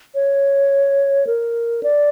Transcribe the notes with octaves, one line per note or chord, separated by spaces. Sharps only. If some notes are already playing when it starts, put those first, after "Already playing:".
C#5
A#4
D5